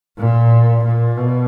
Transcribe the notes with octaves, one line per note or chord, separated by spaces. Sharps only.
A#2
A#2
B2